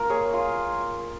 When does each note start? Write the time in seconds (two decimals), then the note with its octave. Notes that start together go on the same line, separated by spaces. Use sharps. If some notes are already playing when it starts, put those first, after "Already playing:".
Already playing: A#3 F4 A#4
0.09 G#4 C#5
0.34 F4